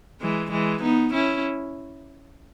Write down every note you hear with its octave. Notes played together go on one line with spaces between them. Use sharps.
E3 G#3
E3 G#3
B3 D#4
C#4 E4